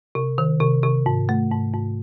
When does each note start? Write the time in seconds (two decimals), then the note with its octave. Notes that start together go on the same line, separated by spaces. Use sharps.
0.15 C3
0.38 D#3
0.60 C3
0.83 C3
1.06 G#2
1.29 A3
1.51 G#2
1.74 G#2